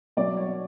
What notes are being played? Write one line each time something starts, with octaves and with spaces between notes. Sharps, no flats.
B2 F#3 D5
C#5